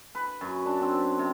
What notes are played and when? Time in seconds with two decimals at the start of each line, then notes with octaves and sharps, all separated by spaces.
0.15 B4
0.41 F#2
0.66 D4
0.82 C4
1.19 C3